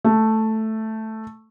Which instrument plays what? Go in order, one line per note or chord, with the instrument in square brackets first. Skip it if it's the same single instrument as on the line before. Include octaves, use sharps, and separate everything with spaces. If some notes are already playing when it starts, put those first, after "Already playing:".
[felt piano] A3